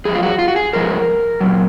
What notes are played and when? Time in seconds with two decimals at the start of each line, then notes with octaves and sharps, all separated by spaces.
0.05 F#2 F3 G#3 G#4
0.15 F4
0.23 F#4
0.39 F4
0.48 F#4
0.56 G#4
0.73 G#2 F3 G#3 A#4
1.41 A#2 F#3